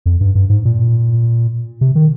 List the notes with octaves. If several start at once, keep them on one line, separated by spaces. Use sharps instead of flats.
F2
G2
G2
G#2
A#2
C3
D#3